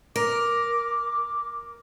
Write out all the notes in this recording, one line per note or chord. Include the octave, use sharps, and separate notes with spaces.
A#4 D6